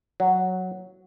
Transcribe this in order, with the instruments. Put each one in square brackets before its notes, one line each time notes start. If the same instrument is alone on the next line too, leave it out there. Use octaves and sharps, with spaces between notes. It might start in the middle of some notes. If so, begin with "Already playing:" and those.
[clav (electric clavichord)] F#3